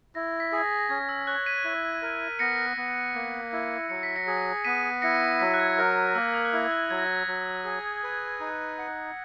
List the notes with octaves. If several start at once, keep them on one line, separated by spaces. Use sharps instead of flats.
E4 A#6
B6
G#4
A#6
A#6
C#4 G#6
E6
C#5 F#6
B6 D#7
E4
A#4
B3 A#6 C#7
B3
A#3
E4
F#3 C#7
B6
A#6 C#7
G#4
B3 B6 D#7
E4 A#6 C#7
F#3 B6
F#6
G#6
A#4 F#6
A#3 E6
D#6
F#6
E4 E6
F#6
F#3 G#6
A#6
G#6
F#3
G#4
B4
D#4
F#5